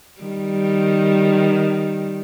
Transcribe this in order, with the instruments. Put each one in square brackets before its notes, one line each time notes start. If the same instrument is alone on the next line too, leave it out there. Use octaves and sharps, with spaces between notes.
[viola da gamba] D#3 G3